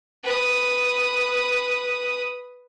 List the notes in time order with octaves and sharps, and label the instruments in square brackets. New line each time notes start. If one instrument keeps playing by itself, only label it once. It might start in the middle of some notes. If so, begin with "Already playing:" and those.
[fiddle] B4 D#6